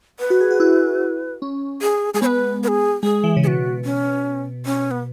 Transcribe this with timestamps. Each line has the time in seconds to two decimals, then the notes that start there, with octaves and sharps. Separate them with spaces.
0.20 B4
0.30 F#4
0.41 G#4
0.51 F#4
0.60 E4
1.42 C#4
1.82 G#4
2.14 G#3 G#4
2.22 B3 C#5
2.26 B4
2.63 B4
2.68 G#4
3.03 G#3 G#4
3.24 E3
3.37 C#3
3.44 B2 F#4 G#4
3.85 C#4
4.65 C#4
4.91 B3